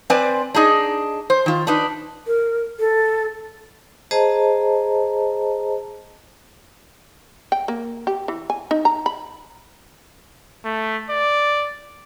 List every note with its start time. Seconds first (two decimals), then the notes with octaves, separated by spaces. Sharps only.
0.10 C4 B4 C5 D5 G#5
0.55 D4 D#4 G#4 D#5
1.30 C5
1.46 D#3 F4
1.67 D4 D#4 B4
2.27 A#4
2.79 A4
4.11 G#4 C5 D#5 A5 A#5
7.52 G5
7.68 A#3
8.07 G4
8.28 E3
8.50 G#5
8.71 D#4
8.85 A#5
9.06 B5
10.65 A3
11.10 D5